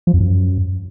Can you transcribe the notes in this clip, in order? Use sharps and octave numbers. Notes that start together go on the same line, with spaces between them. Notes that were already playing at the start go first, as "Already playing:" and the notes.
F3
F2
F#2